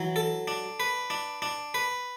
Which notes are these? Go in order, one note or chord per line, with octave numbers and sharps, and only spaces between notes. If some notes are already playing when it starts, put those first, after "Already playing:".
Already playing: E3 F#3
A4
D4
B4
D4
D4
B4